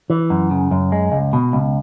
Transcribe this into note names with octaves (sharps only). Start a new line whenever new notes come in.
E3
F#2
C#3
F#2
G#3
C#2
B2
C#2